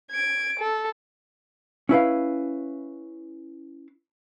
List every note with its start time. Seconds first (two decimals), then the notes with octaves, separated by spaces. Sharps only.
0.11 G#6 D7
0.59 A4
1.89 C#4 E4 B4 F5